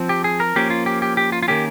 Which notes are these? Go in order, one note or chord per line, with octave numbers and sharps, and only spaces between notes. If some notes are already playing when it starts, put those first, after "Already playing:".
Already playing: F3 C4
G4
G#4
A#4
F3 A#3 C#4 G4
F4
G4
G4
G4
F4
F4
D#3 A#3 C#4 G4